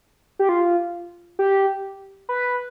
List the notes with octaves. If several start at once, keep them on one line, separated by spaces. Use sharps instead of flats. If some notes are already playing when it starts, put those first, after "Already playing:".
G4
F4
G4
B4